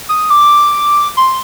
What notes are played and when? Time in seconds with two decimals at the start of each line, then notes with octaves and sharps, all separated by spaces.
0.09 D#6
0.30 D6
1.17 C6